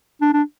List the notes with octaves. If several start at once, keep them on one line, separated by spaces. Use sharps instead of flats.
D4
D4